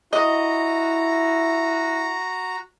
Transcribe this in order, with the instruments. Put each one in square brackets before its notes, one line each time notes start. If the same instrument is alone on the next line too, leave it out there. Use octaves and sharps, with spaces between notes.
[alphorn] E4 [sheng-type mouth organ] F#4 A#5 [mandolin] D#5